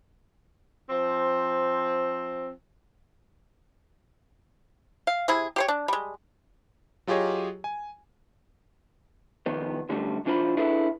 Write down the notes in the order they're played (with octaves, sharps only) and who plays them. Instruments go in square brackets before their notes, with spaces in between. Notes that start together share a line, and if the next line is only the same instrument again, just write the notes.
[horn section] F3 C4
[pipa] F5
C3 E4 G#4
G4 C5 C#5
D4
G3 G#3
[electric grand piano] F#3 F4 G4 G#4 C#5 D#5
G#5
[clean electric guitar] C2 F2 D#3 B3
F#2 D3 G3 A3
B1 E3 D4 F4 C5 B5
D4 E4 G#4 A4 B4